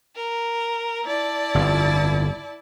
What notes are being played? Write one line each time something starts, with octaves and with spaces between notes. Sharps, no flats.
A#4
E4 D5 A5
G1 F2